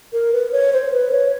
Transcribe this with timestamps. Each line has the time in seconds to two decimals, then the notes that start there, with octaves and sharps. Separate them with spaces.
0.13 A#4
0.33 B4
0.52 C#5
0.73 C5
0.93 B4
1.12 C#5